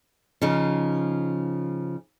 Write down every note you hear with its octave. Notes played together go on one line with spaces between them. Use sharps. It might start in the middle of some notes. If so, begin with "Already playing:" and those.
C#3 F3 D#4